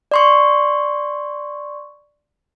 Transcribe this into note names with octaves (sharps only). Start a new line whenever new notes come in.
D5 C6 C#6